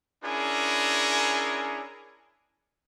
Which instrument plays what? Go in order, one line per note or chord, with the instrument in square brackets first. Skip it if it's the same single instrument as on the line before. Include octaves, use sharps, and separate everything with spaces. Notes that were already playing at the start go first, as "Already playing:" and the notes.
[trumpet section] C#4 D4 E4 G#4 A#4